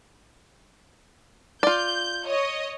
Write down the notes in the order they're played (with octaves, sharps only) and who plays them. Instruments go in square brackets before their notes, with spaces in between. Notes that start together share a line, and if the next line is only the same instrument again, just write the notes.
[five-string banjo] F4 D5 [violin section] G6
[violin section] C#5 D#5